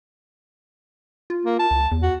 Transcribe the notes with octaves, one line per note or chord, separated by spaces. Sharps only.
F4
A#3
A5
C#2
E2
F#4